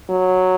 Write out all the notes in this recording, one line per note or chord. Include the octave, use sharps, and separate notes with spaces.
F#3